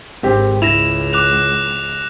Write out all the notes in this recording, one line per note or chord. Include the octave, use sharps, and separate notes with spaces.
G#1 C4 G4
C#2 E4 A#6 E7 F7
D6 F#6 F7